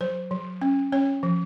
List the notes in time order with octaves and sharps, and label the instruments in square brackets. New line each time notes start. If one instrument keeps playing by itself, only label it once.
[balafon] F#3 C5
F#3
C#4
C#4 C#5
F3